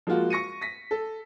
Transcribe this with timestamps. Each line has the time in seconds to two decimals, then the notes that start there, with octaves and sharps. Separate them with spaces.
0.07 F3 G#3 A#3 F4 F#4
0.30 C#6 A#6 C#7 D#7
0.61 A#6 B6
0.91 A4